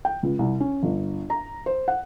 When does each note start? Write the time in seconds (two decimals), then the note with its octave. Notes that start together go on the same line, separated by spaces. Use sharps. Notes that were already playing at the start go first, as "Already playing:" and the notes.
0.05 G5
0.23 C#2
0.39 C2
0.60 C#4
0.83 G1
1.30 A#5
1.66 C5
1.88 F#5